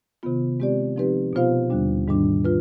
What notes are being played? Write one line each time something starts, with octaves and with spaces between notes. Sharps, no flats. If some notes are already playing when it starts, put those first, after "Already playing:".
C3 D#3 B3 F4
G#3 C4 G4 D5
F3 C4 D#4 G4 B4
B2 B3 F4 C5 F5
D#2 D3 G3 D4
G#2 D#3 G3 D4
F4 B4